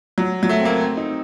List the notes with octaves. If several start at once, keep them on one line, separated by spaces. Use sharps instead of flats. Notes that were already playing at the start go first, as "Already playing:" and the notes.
F#3
F#3
A3
C4
A#3
C4
D#4